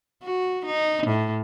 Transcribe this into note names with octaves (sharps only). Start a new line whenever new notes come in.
F#4
D#4
A2